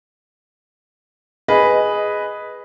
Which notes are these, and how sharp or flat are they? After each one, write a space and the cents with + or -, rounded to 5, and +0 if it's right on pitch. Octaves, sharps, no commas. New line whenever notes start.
G#4 +0 B4 +0 D#5 +0